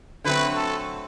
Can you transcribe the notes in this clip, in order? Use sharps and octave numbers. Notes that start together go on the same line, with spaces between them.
D3 F#3 A3 C4 B4
A4